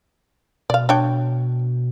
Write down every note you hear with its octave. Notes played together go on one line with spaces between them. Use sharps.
B2 D5 F5
D4 C#5 G5